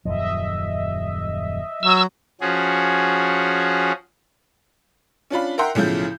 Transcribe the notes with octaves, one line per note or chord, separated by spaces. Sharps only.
D#1 F#2 F3 D#5 E5
F#3 E6
F3 C#4 F#4 G#4
C#4 D4 F4 B5
A#4 E5 F#5 G5 A#5 C6
B1 A2 C#3 F3 G6